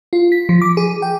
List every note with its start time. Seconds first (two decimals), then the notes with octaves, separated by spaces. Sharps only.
0.13 F4
0.32 B6
0.49 F3
0.62 D6
0.77 G#4
1.02 G5